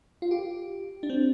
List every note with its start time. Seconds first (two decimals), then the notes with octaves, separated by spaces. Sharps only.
0.22 F4
0.31 G4
1.03 D4
1.10 C4